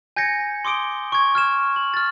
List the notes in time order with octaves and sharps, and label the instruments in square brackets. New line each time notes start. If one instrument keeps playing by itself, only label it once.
[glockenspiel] G#5 G6 G#6 A#6 C#7
C6 D6 D#6 D7 G7
C#6 G#6
F6 G#6 E7
F#7
F6 A6